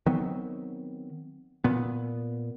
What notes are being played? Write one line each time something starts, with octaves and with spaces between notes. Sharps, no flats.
D#3 F#3 B3 C4
A#2 B3